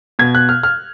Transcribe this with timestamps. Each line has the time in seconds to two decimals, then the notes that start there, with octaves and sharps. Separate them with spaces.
0.19 B2 G#6
0.35 F#6
0.49 F6
0.63 F6